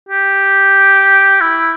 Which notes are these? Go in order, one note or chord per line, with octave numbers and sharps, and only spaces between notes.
G4
E4